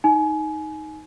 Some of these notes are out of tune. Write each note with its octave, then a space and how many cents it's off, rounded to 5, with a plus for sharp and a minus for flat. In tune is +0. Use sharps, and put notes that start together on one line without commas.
D#4 +5 G#5 +25